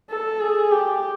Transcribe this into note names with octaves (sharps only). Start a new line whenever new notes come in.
A4
G#4
G4